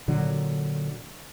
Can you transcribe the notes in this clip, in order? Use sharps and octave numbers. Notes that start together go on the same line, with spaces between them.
A#2 D3 F#3